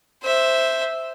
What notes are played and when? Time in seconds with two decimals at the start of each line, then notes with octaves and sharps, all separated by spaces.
0.23 C5 E5